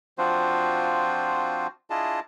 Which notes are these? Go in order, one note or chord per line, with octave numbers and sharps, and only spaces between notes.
F3 C4 D4 F4 F#4 C5
D4 E4 F4 G#4 D#5 A5